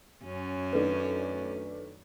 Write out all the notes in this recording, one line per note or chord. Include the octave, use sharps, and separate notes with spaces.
F#2 C#4
D#3 A3 D4 B4